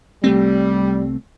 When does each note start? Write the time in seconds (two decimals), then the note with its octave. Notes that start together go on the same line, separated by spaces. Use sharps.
0.24 C2 G3 A3 C4